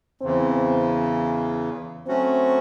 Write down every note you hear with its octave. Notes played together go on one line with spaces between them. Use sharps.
E2 C#3 E3 C4
F#3 A3 C4 C#4 F#4